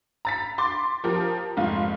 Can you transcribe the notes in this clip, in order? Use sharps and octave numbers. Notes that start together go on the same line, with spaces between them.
A#5 A6 B6
C6 D6 A6
F3 G4 A#4
F1 G#2 F4